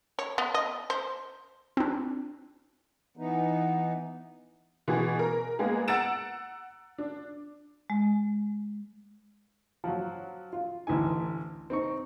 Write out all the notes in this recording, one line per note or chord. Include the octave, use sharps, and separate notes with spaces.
C#5
B3
D#5
C5
C4 D4
E3 B3 D#4
B2 E3 G#4
A#4
G#3 A#3 B3 G#4
F#5 A#5 E6 A6 D7 E7
D4
G#3
F3 F#3
F4
A1 D2 E3 D#4 G#5
C4 D#4 C#6